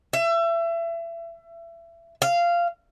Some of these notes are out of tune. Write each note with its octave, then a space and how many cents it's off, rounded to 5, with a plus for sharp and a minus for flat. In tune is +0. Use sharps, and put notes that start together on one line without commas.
E5 +30
F5 -15